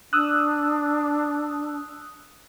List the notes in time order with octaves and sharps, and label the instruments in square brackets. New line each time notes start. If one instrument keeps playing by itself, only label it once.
[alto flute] D4 [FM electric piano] D#6 E6 F#6